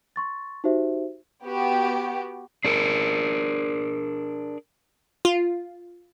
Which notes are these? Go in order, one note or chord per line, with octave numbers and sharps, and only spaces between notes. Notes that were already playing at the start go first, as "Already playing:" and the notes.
C6 C#6 A6
D#4 F#4 G4 C5 E5
B3 F#4 G4
D4 G#4 A#4
F4